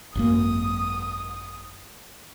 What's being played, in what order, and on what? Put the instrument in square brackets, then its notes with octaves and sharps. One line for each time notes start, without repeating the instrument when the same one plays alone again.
[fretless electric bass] G#1 F#2 A#3 [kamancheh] D#6